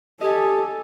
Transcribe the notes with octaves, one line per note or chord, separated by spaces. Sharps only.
G4 A4 D#5 G#5